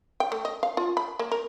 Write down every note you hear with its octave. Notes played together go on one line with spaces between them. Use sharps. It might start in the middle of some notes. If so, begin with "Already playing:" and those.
G5
A3
D#5
F5
F4
B5
A#3
A#4